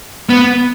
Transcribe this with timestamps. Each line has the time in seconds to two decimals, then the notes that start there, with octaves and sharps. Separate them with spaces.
0.29 B3